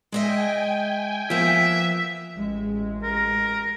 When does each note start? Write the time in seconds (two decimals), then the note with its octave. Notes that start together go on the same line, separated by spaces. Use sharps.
0.12 G#3 D#5 E5 G5 G#5
1.30 F3 A#3 B3 E5
2.36 A1 G#3
3.03 A#4